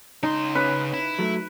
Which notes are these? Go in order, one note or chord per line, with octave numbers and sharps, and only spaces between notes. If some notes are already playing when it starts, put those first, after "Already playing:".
C#3 D#4 C6
C#4 B4
E4
F#3 A3